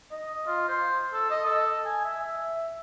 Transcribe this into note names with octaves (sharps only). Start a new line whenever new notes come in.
D#5
F4
C5
A4
D#5
A4
G#5
E5
E5